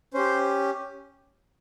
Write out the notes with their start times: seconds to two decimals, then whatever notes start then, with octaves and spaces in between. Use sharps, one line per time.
0.14 C#4 G4 C5